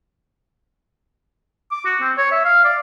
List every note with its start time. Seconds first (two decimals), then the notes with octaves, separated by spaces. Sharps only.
1.71 D6
1.85 F#4
2.01 C4
2.18 C#5
2.32 E5
2.45 F5
2.65 D5